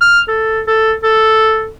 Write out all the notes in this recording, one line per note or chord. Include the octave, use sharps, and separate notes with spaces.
F6
A4
A4
A4